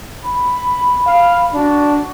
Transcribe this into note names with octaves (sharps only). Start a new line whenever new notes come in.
B5
F5
D4 F#4